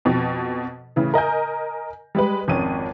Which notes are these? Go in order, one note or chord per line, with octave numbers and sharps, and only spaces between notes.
F2 B2
A2 C#3 E3
A#4 D#5 G#5 G6
G3 G#3 B4
G#1 F2 C#4 D#7